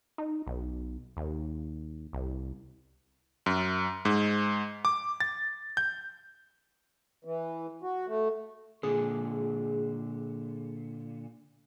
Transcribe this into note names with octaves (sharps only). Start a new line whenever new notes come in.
D#4
B1
D#2
C2
F#2
G#2
D6
A6
G6
E3
F#4
A3
A#2 D3 G#4